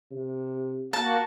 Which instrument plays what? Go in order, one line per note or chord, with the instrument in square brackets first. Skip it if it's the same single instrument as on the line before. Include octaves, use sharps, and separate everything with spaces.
[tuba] C3
[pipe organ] A#3 F#4 [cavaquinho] A5